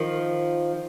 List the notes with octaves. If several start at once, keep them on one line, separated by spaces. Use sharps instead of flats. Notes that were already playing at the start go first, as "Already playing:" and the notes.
Already playing: D#3 F3